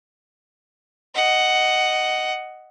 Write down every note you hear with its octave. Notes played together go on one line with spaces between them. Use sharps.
D#5 F#5